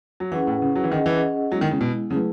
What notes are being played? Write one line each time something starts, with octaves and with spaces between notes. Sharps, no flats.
F#3
E3 C#4 E4 G#4 B4 F#5
A2
C#3
F#3
E3
D#3 C#4 G#4 D#5 F#5
E3
F#3 G#3 B3 E4
D#3
C#3
B2
C#3 F#3 A3 E4 G#4 B4